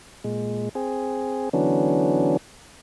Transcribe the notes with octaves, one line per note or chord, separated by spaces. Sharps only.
A#2 G#3
C4 G#4
D3 E3 F#3 B3 C#4 D4